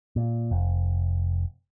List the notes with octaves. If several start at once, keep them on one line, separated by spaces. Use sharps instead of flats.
A#2
F1